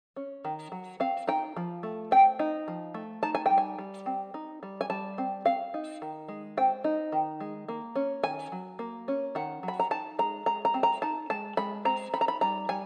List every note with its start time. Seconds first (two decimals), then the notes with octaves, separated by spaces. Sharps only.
0.16 C#4
0.45 D#3
0.72 F#3
1.00 C4 F5
1.27 D#4 G5
1.56 F3
1.83 A3
2.11 C4 G5
2.39 D#4
2.68 F3
2.94 A3
3.23 D#4 A5
3.35 G#5
3.46 G3 G5
3.58 G#5
3.79 G3
4.06 C4
4.34 D#4
4.63 G3
4.81 G#5
4.90 G3 A5
5.18 C4
5.45 C4 F5
5.74 D#4
6.02 D#3
6.28 G#3
6.57 C4 G5
6.84 D#4
7.12 D#3
7.40 G#3
7.68 A#3
7.96 C#4
8.23 D#3 G#5
8.52 F#3
8.79 A#3
9.08 C#4
9.35 D#3 F#5
9.63 F#3
9.68 B5
9.80 A#5
9.91 D#4 A5
10.19 G#3 A#5
10.46 G#3 A#5
10.65 A#5
10.74 C4
10.83 A#5
11.02 D#4 A5
11.30 G#3 A5
11.57 G#3 B5
11.85 C4 A#5
12.14 D#4 B5
12.21 A#5
12.28 B5
12.41 G3 A#5
12.69 G3 G#5